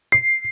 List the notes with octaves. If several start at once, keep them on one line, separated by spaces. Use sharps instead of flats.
C7